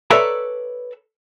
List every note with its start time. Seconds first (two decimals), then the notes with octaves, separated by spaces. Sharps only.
0.10 A4 B4 C#5 D5 E5 A#5